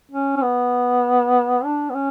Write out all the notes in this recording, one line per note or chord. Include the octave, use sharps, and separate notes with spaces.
C#4
C#4
B3
D4
B3
C#4